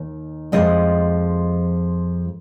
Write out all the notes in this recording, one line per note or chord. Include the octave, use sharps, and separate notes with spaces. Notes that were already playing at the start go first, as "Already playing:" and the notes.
Already playing: D#2 D#3
F2 C#3 F3 G#3 D#5